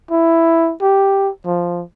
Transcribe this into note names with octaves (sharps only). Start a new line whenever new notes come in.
E4
G4
F3